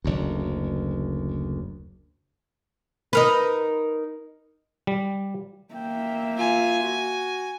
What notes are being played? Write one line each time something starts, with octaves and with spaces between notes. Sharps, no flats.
F#1 D2
D#4 A#4 B4
G3
A#3 E5 G5
F4 G#5
F#4